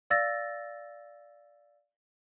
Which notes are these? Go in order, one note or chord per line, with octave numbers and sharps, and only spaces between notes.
D5 F5 E6 A6 A#6